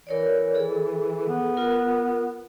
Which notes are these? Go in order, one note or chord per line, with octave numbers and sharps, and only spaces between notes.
E3 A#4 C#5 D5
G#4 A4
B3
F4 A#4